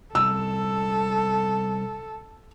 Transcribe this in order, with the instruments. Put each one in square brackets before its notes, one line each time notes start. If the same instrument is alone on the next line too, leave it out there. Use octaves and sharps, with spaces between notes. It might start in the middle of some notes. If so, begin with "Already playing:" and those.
[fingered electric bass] C3 G3 C#4 [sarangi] A4 [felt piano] E6